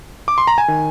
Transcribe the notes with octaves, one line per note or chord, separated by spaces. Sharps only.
D6
C6
A#5
G#5
D#3